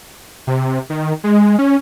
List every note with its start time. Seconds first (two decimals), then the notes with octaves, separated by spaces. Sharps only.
0.47 C3
0.90 D#3
1.24 G#3
1.59 C#4